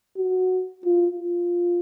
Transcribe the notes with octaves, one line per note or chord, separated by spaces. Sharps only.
F#4
F4
F4